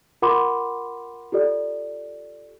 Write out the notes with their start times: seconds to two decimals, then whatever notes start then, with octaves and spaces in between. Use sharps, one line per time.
0.22 F4 A#4 F#5 B5 C6 D6
1.32 F4 G4 A4 D5